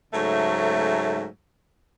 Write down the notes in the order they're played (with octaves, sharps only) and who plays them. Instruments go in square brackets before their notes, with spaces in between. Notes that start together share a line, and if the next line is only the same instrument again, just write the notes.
[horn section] G#2 C#3 F#3 A3